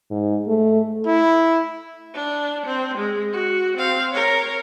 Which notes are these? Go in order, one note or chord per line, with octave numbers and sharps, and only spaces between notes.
G#2
A3
E4
D4
C4
G#3
F#4
C4 F5
A#4 C#5